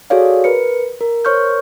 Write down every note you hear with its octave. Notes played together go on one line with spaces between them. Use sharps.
F#4 G#4 A4 C#5 D5 F5
A#4 B4 C#7
A#4
A#4 C5 C#5 C#6 F6 G6